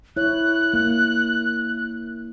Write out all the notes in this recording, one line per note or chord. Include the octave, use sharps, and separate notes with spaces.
E4 C#5 F#6
A#3